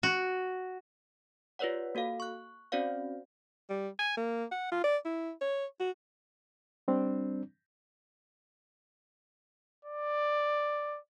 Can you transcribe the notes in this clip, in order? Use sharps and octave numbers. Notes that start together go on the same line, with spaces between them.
F#4
F4 G4 B4 C#5 D5 F#5
A#3 F#4 A4 F5
C#6 F#6
C4 C#4 F#4 C5 D5 F5
G3
G#5
A#3
F#5
F4
D5
E4
C#5
F#4
G3 C4 D4
D5